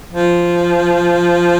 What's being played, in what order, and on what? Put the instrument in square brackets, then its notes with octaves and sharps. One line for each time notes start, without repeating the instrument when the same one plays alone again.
[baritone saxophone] F3